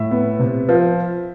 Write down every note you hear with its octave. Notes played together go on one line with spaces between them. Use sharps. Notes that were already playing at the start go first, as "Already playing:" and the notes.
Already playing: A2 E5
B3
C3
F3